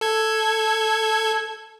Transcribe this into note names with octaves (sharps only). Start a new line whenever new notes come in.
A4 G#6